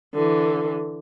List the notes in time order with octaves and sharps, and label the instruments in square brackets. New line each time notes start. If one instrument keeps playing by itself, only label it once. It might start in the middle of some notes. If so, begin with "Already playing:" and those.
[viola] D3 E3